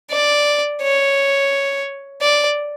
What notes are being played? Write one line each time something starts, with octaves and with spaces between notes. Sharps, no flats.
D5
C#5
D5